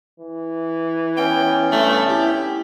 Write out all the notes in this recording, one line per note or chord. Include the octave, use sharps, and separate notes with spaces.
E3
B3 C#4 G5
G2 A3
E4 G4